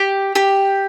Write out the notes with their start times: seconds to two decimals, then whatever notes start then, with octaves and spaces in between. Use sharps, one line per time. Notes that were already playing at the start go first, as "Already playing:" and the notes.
Already playing: G4
0.35 G4